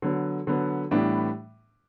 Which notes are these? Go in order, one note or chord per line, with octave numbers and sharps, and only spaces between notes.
D3 F#3 B3
D3 F#3 B3
A2 E3 G3 B3 D4